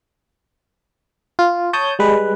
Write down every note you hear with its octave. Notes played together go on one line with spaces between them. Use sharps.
F4
C#5 A5 D#6 G6
G3 G#3 B4